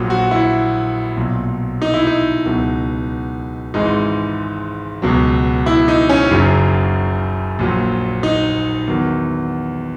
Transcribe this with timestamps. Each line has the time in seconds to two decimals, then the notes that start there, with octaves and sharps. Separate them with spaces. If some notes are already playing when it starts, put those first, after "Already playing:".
Already playing: A#1 A#2 F#3
0.10 F#4
0.31 E4
1.17 B1 A#2 F#3
1.82 D#4
1.94 E4
2.07 D#4
2.45 C#2 B2 F#3
3.74 G#1 G#2 E3 G#3 D#4
5.02 C#2 B2 F#3
5.66 E4
5.88 D#4
6.09 C#4
6.31 F#1 F#2 C#3 F#3
7.59 A#1 A#2 F#3
8.23 D#4
8.87 E2 D#3 F#3